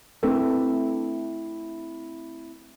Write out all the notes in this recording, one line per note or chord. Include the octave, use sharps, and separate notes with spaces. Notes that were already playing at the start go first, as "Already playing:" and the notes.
A3 C4 D4 E4 A4 B4